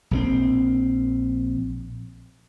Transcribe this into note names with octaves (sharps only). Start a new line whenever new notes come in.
A#1 D#3 C4